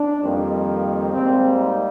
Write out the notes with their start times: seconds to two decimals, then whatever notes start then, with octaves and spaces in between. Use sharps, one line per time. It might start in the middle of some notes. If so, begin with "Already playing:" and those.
Already playing: D4
0.22 F2 D#3 G3 A#3 C4
1.13 G#2 G3 A#3 C4
1.58 D#4